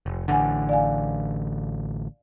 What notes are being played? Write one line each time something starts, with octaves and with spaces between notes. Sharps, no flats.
F1
A1 D3 F#5 G#5
D5 F5 G#5